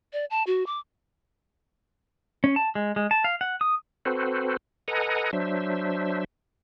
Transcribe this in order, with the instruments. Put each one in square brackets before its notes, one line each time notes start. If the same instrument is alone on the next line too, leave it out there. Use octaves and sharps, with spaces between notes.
[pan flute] D5
A5
F#4
D6
[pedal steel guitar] C#4
A5
G#3
G#3
A5
F5
F#5
D#6
[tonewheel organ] C4 F#4 A4 B4 C5
A4 B4 D#5 F#5 G#5 A#5
F#3 D4 C5 E5